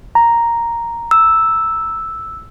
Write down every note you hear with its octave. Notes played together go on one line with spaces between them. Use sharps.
A#5
E6